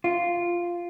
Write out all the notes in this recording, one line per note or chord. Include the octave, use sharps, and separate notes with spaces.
F4